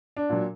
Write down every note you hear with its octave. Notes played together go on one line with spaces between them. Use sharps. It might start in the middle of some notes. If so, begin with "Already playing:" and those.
D4
A#2 F#3